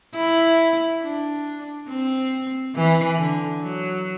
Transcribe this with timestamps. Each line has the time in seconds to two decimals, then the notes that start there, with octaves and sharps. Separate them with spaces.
0.16 E4
1.02 D4
1.90 C4
2.76 E3
3.18 D3
3.62 F#3